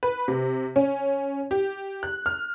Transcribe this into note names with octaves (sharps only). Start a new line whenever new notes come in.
B4
C3
C#4
G4
F#6
F6